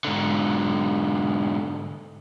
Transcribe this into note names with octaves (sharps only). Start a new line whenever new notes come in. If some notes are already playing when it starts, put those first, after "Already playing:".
G#2 D3